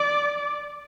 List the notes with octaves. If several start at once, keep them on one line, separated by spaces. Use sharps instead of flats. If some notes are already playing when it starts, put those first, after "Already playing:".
Already playing: D5